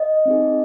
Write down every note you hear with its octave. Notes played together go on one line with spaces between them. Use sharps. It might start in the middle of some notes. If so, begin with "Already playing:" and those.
Already playing: D#5
C4 D#4 G#4